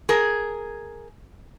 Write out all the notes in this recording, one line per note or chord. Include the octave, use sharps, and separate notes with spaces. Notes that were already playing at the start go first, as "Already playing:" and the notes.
G#4 A#4